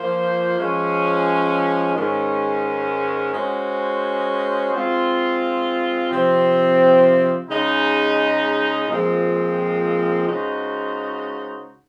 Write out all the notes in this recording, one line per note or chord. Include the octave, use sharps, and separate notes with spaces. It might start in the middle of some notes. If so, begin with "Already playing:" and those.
Already playing: F3 A#3 F4 C5
F3 G#3 C#4
G#2 D#3 G#3 C#4
G#3 C#4 F#4 C5
G#3 C4 F4
C3 F3 C4
C#3 G#3 D#4
A#2 F3 G#3 C4
C#3 G#3 D#4 F#4 C5